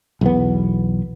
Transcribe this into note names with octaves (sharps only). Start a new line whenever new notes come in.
B1 E2 B3